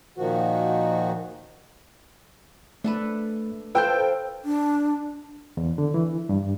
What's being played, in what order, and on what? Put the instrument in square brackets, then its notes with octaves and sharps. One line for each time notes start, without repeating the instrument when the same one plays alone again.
[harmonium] A#2 D#3 F3 F#4
[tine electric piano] A3 [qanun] D4 A4 B4
[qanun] F4 C5 A5 [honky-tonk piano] A4 G5 E6 [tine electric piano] B4 G6
[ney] D4
[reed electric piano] E2
D3
E3
G2